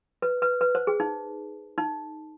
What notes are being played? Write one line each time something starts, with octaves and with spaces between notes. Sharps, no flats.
B4
B4
B4
C5
G#4
D#4
D#4